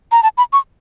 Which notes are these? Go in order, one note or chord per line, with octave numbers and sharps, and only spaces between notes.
A#5
A5
B5
C#6